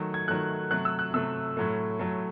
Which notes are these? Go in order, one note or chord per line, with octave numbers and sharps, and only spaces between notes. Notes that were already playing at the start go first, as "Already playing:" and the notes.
Already playing: D#3 F#3 A3
G#6
D#3 F#3 A3 F#6
C3 F#3 A3 F#6
E6
F#6
C3 F#3 A3 E6
A2 F#3 A3
A2 F#3 A3